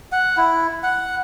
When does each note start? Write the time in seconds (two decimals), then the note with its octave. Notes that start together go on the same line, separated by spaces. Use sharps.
0.12 F#5
0.37 E4
0.83 F#5